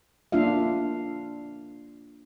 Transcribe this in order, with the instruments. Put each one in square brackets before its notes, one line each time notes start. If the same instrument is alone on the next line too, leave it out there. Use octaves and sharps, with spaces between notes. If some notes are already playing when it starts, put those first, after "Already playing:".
[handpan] A#3 D4 F4 E5 F5